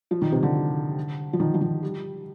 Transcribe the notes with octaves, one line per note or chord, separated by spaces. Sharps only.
F3
D#3
C3
D3
F3
D#3
F3
D#3
G3